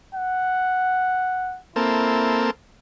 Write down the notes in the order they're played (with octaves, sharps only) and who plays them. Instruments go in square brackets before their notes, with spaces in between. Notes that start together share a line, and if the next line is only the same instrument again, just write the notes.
[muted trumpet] F#5
[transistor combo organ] A#3 C4 A4 [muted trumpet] E4